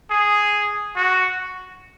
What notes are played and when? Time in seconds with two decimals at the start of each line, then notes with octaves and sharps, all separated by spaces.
0.11 G#4
0.96 F#4